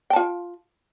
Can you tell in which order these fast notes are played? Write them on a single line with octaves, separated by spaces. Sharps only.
G5 A5 F4